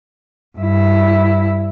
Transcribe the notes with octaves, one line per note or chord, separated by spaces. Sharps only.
G2 E4